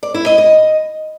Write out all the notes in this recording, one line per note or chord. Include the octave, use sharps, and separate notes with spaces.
D5
E4
D#5
D#5